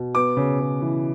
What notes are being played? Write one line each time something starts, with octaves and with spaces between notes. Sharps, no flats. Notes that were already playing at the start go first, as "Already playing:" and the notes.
Already playing: B2
B3 D6
C#3
C#3
E3